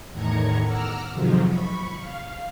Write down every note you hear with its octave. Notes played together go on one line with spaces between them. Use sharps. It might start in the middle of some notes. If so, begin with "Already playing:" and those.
E2 A2 D#3 A#5 G#6 C#7
F#5 A#5 D6 E6 F6
F2 G#2 C3 D#3 F3 F#3
B5 C#6
F5